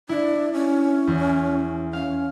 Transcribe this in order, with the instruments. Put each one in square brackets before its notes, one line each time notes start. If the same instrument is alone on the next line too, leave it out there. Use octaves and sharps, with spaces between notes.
[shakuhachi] D4 [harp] E4
[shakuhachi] C#4
[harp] E2
[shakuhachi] C#4 [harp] F5